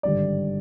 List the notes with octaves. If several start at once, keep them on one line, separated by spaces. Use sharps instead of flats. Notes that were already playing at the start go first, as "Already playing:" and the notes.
G#1 G2 D3 G3 D5